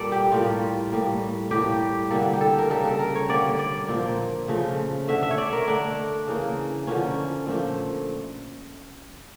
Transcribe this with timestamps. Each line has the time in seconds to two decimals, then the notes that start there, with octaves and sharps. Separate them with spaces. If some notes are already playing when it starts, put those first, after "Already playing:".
Already playing: A#2 G3 A#3 A4 D5
0.12 G4
0.32 A2 G3 A#3 F4
0.92 A2 G3 A#3
1.51 A2 G3 A#3 G4
2.10 D3 G3 A#3 A4
2.33 G4
2.41 A4
2.58 A#4
2.69 C#3 G3 A#3 A4
2.85 A4
2.99 A#4
3.15 C#5
3.29 D3 G3 A#3 D5
3.59 D5
3.88 A#2 F3 A#3
4.48 C#3 F3 A3
5.07 D3 A3 E5
5.23 E5
5.31 C#5
5.38 D5
5.52 A#4
5.67 D3 A3 D4
6.27 C#3 E3 A#3
6.87 D3 F3 A#3 C#4
7.46 A#2 F3 A3